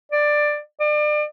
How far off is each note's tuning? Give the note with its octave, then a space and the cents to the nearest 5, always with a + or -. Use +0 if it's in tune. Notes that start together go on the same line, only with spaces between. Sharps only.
D5 +10
D5 +35